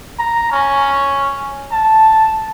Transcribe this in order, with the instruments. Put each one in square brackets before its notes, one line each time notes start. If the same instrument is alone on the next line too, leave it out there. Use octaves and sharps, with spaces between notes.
[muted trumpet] A#5
C#4
A5